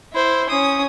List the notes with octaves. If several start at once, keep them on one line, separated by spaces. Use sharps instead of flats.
E4 C5
C#4 D#6